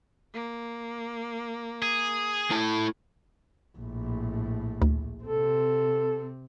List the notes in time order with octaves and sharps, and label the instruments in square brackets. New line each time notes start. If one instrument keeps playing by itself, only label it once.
[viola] A#3
[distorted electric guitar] G#4
[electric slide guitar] A3 E4 A5
[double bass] A#1 A2
[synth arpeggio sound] D2
[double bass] C3 C4 [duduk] A4